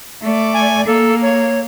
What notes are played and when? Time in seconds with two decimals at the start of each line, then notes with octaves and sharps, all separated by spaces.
0.22 A3 D5
0.54 G#5
0.86 A#3 A4
1.22 C#5